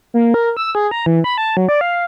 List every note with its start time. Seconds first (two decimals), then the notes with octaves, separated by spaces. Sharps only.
0.14 A#3
0.34 A#4
0.57 E6
0.75 G#4
0.91 A#5
1.06 E3
1.24 B5
1.38 A5
1.57 F#3
1.69 D5
1.81 F5